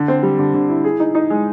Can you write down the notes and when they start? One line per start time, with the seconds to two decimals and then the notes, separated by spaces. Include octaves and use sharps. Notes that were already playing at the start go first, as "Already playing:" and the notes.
Already playing: D3
0.08 C4
0.23 G3
0.39 D3
0.54 D3
0.69 E4
0.84 G#4
1.00 D#4
1.15 D#4
1.30 G#3